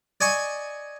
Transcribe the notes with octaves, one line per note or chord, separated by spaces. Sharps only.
D5 D#5 G#5 C#6